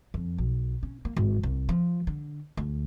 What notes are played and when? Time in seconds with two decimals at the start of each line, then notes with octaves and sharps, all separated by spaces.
0.14 F2
0.38 B1
0.83 C#4
1.05 A#3
1.17 G#1
1.43 C2
1.69 F3
2.07 D3
2.57 D2